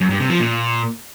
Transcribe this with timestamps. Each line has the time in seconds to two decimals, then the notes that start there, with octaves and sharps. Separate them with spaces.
0.01 F#2
0.10 G2
0.20 C3
0.30 F3
0.40 A#2